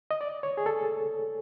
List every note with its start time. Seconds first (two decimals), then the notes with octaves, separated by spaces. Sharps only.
0.11 D#5
0.21 D5
0.43 C#5
0.57 G#4
0.66 A4